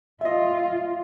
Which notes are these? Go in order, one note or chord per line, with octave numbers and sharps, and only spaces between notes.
F4 D#5 E5